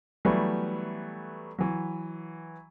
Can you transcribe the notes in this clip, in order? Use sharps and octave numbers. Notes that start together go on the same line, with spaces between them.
E3 F#3 G3 A3 B3
E3 F#3